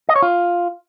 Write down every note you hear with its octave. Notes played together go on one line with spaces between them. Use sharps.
D#5
C#5
F4